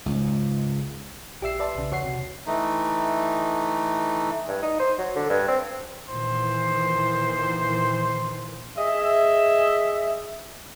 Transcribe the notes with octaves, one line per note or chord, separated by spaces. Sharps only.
C#2 G#2
A#1 G4 D5 E5 E6 C7
B4 D5 E5 A5 C6
B1 C#3
E2 F#4 C#5 F#5 C7
C3
E3 A3 D#4
G2
D#4
C5
F#3
D3
G2
C4
A#2 D#3 E3 C5
G#4 D#5 E5